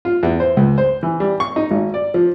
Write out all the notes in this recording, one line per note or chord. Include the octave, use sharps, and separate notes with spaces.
F4
E2
C5
C#2
C5
E3
G3
C#6
D#4
G#1
D5
F3